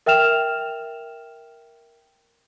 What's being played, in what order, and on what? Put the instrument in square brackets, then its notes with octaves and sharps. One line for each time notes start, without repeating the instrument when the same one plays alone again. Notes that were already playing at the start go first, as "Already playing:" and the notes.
[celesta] A#4 E5 G5 F6 E7 F7